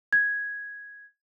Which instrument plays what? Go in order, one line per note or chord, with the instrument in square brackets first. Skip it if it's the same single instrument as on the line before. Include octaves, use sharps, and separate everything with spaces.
[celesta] G#6